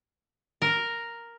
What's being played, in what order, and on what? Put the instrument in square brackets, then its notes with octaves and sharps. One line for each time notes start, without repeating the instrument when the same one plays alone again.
[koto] A#4